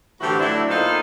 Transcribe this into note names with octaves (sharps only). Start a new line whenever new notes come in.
A2 D3 E3 C4 F#4 G4
F#3 A3 D4 E4
A#2 B3 D#4 A4 C5 F5